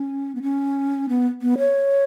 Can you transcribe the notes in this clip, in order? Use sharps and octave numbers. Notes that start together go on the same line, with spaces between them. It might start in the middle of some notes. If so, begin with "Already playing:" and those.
Already playing: C#4
B3
C#4
B3
B3
C#5